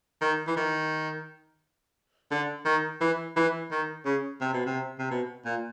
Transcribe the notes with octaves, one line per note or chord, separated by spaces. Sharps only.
D#3
E3
D#3
D3
D#3
E3
E3
D#3
C#3
C3
B2
C3
C3
B2
A#2